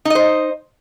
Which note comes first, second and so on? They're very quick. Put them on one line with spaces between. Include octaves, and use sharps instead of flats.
D#4 D#5 C5